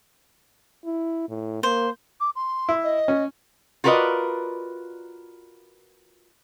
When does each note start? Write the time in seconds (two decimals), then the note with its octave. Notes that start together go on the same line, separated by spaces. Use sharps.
0.85 E4
1.29 A2
1.63 A#3 C5
2.20 D6
2.35 C6
2.69 E4
2.84 D#5
3.08 C#4
3.84 F4 F#4 A#4 B4 D5 D#5